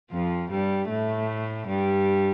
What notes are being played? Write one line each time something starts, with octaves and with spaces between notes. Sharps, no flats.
F2 F3
G2 G3
A2 A3
G2 G3